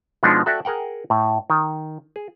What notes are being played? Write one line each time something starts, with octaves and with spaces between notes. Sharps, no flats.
B2 F3 G#3 B3 D4 D#4
F#4 A4 D5 E5 F#5 G5
G#4 A#4 F#5 G5
A2
D#3
G#4